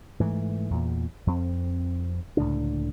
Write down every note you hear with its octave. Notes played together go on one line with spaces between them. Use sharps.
G#2 E3 A3
E2 A#2
F2 C4
C#2 A2 D3 D4